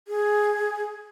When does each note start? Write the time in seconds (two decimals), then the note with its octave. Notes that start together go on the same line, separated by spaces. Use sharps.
0.08 G#4